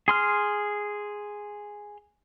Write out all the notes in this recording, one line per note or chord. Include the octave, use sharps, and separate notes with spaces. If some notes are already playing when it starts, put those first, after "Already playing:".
G#4 C6 F6